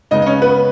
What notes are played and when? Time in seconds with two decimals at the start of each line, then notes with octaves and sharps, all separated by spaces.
0.11 C#3 G#3 B3 D#4 D#5
0.22 D#5
0.26 C#4 C#5
0.42 B3 B4